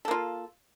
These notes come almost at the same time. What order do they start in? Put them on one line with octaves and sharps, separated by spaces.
A4 A#3 F4